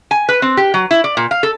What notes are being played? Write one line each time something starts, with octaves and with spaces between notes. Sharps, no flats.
G#5
B4
C4
G4
F#3
E4
D5
A#2
F5
A4